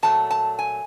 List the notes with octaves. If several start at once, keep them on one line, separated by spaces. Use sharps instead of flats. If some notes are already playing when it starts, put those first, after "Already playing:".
A#2 F#3 A3 A5
A5
G#5